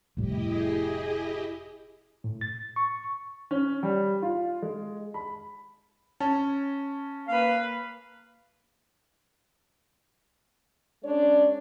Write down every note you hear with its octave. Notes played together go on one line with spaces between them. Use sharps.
F1 A2 G3 E4 G4 D#5
G#4
A2
A6
C#6
C#4
G3
F4
G#3
B5
C#4 A5
A#3 B4 F5
G#3 C#4 D4 C#5 D5